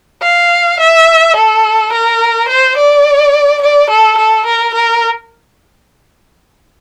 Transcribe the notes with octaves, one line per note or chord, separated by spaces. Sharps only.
F5
E5
A4
A#4
C5
D5
D5
A4
A4
A#4
A#4